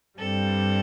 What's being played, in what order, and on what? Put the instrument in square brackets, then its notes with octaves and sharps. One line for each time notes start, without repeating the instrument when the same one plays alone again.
[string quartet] G2 G3 C4 A4